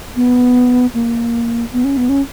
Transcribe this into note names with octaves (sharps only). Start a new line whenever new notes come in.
B3
A#3
B3
C#4
B3
C#4